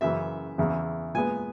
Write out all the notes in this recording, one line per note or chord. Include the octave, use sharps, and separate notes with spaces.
F#2 C#3 E3 E5
E2 C#3 E3
A#2 G#3 B3 G#5